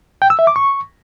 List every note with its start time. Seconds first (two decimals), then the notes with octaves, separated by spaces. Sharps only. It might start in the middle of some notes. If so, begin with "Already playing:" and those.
0.22 G5
0.30 E6
0.39 E5
0.47 D6
0.56 C#6